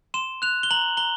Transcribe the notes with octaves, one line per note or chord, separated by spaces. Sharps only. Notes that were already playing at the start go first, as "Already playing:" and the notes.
C6 E7
F#6 F7
G7
A#5 F#7
A#5 G7